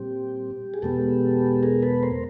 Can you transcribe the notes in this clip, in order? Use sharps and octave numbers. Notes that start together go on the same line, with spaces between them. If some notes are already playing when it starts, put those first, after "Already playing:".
Already playing: A#2 G3 C4 G4
G#4
E2 B2 G#3 B3 G4 A4
G#4 A#4
A4 B4
A#4 C5